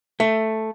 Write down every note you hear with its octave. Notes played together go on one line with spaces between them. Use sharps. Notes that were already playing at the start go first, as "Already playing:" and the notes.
A3